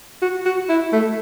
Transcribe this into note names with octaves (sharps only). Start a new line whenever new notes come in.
F#4
F#4
E4
A3